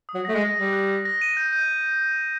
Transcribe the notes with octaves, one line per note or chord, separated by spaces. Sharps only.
D#6
F#3
A3 A#6
G#3
A#6
G3 A#6
F#6
A#6
A#6
D#7
G6
G6